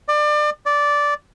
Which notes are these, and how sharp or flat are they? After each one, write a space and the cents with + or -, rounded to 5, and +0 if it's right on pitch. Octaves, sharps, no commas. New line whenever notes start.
D5 +30
D5 -10